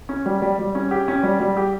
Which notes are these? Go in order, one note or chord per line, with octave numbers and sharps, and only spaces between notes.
C#4
G3
G3
G3
C#4
G4
C#4
G3
G3
G4